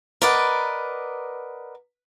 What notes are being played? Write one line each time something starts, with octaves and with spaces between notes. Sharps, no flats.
A#4 B4 D5 D#5 F#5